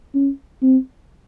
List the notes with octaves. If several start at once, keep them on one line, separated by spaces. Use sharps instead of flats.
C#4
C4